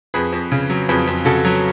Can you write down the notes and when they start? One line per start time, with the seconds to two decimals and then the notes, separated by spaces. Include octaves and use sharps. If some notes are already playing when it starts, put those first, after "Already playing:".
0.14 F2 G#4 B4
0.32 F2
0.52 C#3
0.70 F#3
0.89 F2 G#4 B4
1.07 F2
1.25 C#3 F#4 A4
1.45 F#3